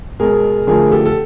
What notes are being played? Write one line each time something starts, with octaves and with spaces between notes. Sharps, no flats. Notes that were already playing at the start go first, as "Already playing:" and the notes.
B2 G#3 B3 G#4 A#4
D3 F3 A3 G#4 A#4
G4 A4
A4